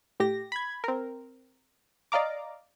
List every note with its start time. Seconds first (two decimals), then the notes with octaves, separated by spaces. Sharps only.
0.20 A2 G4 A#6
0.52 B5 G#6
0.84 C4 A#4
2.12 D5 D#5 F5 A#5 D6